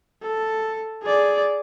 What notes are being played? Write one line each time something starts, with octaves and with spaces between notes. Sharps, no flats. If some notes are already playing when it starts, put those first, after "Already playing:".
A4
G#4 D5